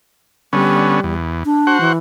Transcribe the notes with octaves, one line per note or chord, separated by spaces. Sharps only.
D3 G3 B3 C#4
E2
D4
F#4 C5 F#5
E3